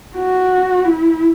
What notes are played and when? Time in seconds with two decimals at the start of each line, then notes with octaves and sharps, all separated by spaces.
0.16 F#4
0.85 E4